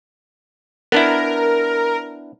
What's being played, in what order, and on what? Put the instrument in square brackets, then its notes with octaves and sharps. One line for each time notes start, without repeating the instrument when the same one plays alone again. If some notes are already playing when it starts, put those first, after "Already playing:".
[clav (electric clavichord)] B3 D4 E4 [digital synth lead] A#4